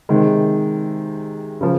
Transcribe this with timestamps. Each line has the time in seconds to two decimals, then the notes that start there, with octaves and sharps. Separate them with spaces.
0.09 C3 D#3 G#3
1.61 C#3 F3